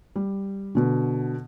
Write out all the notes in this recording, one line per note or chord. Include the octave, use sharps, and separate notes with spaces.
G3
B2 D3